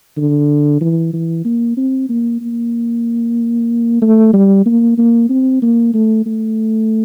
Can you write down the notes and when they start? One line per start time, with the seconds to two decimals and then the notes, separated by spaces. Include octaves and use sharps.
0.17 D3
0.81 E3
1.13 E3
1.45 A#3
1.77 C4
2.09 A#3
2.41 A#3
4.02 A3
4.33 G3
4.66 A#3
4.98 A#3
5.30 C4
5.62 A#3
5.94 A3
6.26 A3